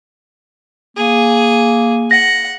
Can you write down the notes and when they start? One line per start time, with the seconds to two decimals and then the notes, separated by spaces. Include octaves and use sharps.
0.97 A#3 G#4
2.11 F#5 A#6